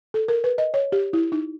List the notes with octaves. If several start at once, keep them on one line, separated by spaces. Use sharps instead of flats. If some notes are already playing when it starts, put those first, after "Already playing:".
A4
A#4
B4
D#5
C#5
G4
E4
D#4